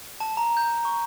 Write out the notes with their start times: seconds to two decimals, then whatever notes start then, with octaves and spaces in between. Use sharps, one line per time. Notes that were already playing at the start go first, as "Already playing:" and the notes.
0.20 A5
0.37 A#5
0.57 G6
0.85 C#6